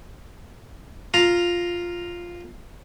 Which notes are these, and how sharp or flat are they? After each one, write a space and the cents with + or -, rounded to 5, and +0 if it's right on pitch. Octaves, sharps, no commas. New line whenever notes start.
F4 +0 A#5 +0